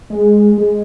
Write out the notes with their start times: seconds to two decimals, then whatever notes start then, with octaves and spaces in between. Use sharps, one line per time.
0.10 G#3
0.58 G#3